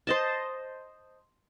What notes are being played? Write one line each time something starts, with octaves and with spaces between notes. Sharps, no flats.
C5 D#5 A5